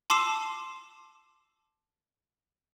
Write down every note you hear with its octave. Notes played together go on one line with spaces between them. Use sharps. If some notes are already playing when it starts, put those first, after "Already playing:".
A5 C6 D6 E6 C7 E7